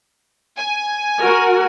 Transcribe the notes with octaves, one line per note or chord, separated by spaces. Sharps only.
G#5
F#4 A#4